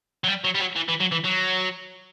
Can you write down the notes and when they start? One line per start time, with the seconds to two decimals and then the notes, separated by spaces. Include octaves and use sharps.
0.24 F#3
0.28 G3
0.44 F#3
0.55 G3
0.60 F#3
0.76 E3
0.89 E3
1.01 F#3
1.12 E3
1.25 F#3